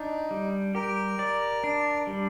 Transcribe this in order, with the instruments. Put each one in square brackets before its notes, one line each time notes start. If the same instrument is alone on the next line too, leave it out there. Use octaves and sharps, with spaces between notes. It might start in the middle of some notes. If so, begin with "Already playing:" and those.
Already playing: [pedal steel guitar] D4 [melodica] D#4
[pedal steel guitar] G3
[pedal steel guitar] G4 [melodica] A#4
[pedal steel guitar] D5
D4
G3